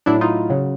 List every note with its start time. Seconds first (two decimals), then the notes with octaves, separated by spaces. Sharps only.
0.06 A2 F#3 D4 E4
0.21 D#4 F4
0.50 C#3 F#3